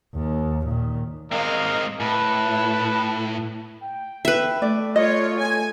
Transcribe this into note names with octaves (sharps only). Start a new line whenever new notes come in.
D#2
A#2 D#3
G#3 C4 A#4 D#5 F5
A2 B4 A5
G5
B4 E5
A3 D5
F4 C#5 D#5
G#5